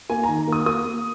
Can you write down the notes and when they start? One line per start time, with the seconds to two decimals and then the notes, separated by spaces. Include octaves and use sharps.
0.10 A#3 G#5
0.23 A#5
0.29 D#3
0.48 A#3 D#6
0.66 A#3 D#6
0.86 A#3